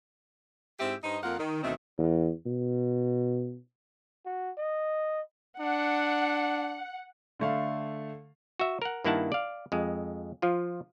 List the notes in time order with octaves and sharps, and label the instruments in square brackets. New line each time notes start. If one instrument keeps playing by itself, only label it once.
[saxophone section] G#2 C4 E4 G4 E5
G2 D#4 C5 D#5
F2 A#3 F4 A#4 F5 F#5
D#3
D2 B2 D#3 A3 C4 D#5
[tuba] E2
B2
[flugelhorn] F#4
D#5
[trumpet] D4 [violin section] F#5
[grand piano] D3 A3 F5
[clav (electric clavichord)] F#4 E5
A#4 F#5
G2 D#3 A#3 E4 F#5 A5
D5 F5
F2 G#3
F3 F4